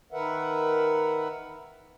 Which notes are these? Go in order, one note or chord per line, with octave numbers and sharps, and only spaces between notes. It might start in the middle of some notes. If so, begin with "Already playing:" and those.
D#3 A#4 B4 E5 F#5